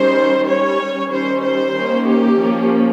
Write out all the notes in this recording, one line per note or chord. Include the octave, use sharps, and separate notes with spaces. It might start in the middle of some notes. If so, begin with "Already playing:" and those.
Already playing: D#3 G3 C#4 C5
G3 C#4 C#5
D#3 G3 C#4 C5
C5
D#3 A#3 C#4
G4
F3 A#3 C#4